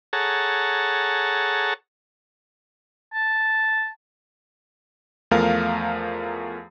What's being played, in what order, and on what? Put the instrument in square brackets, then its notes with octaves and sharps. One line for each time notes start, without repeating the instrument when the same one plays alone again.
[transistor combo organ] G#4 A4 C#5 F#5 A5 A#5
[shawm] A5
[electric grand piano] E2 F3 A3 A#4 F5